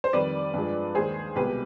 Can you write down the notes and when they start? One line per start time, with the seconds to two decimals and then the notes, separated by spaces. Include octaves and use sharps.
0.04 C5
0.13 F2 D#3 G3 B4 D5
0.54 G2 F3 G#3
0.95 D#2 D#3 G#3 G#4 C5
1.36 C2 B2 G#3 G4 B4